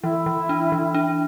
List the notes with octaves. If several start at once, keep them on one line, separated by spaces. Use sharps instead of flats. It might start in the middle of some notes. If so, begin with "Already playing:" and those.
E3 E4
E3
D4
E3
D4